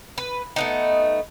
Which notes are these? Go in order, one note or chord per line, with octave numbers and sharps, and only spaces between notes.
B4
A3 B3 D#4